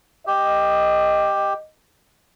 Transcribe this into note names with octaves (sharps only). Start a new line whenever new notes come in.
G4 D#5